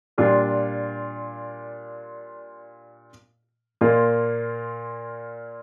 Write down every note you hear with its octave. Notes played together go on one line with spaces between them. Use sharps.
A#2 G3 D4 F4
A#2 A#3 F4